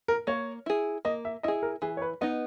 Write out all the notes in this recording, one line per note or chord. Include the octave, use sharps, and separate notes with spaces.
A#4
A#3 C#5
E4 G#4
A#3 D#5
E5
E4 G#4 D#5
A#4
E3 G#4
C#5
B4
B3 D#4 D#5